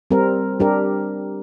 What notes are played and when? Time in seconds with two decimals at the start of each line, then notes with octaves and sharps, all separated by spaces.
0.11 G3 C4 A#4
0.60 G3 D4 G4 A#4